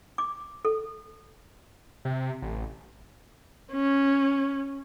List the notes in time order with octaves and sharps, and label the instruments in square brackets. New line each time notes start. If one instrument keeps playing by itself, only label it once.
[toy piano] D6
A4
[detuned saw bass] C3
A1
[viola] C#4